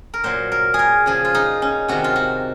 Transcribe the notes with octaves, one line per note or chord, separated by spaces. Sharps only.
A#4
A#2 F#3 C5
A#4
G#4
A#4
C#3 F3 G#4
F4
D#4
C#4
C3 D#3 F#3 F#4
F4
F#4